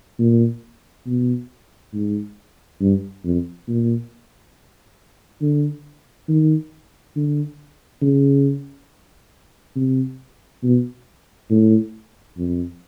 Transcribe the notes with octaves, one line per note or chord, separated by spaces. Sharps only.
A#2
B2
G#2
G2
F2
A#2
D3
D#3
D3
C#3
C3
B2
A2
F2